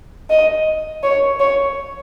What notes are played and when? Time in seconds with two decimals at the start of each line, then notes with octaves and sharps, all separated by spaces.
0.30 D#5
1.03 C#5
1.40 C#5